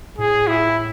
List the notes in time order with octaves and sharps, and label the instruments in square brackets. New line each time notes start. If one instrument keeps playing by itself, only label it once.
[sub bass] A2 [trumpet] G#4
[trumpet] E4